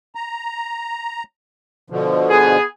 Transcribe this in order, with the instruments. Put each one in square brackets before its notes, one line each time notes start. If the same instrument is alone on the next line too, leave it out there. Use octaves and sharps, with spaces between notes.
[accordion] A#5
B2 D3 F3
[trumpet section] B3 G#4